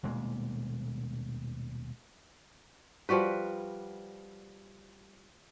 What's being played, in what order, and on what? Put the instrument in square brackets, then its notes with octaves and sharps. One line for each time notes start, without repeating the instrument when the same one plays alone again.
[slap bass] D#1 B2 G#3 A#3
[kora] F3 G3 F#4 B4